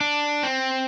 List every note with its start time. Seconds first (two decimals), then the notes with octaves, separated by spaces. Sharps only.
0.01 D4
0.43 C4